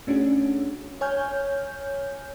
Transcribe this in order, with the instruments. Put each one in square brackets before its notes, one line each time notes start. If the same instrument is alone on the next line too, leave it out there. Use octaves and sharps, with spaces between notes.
[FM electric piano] A3 C#4 D4 F#4 G#4
C#5 G#5 F6 G6